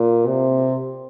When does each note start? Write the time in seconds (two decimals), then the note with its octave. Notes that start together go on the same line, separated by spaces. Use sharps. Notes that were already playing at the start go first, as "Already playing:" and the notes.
Already playing: A#2
0.27 C3